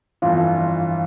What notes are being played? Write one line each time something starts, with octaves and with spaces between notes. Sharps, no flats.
G1 F2 E3 F4